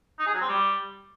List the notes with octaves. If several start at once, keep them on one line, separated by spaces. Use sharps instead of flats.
D#4
G#4
F#3
C4
G3